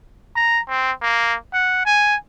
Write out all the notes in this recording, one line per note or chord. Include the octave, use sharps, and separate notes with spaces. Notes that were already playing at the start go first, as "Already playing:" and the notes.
A#5
C4
A#3
F#5
G#5